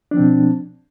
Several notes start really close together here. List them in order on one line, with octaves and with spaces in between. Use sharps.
D4 F3 C4 B2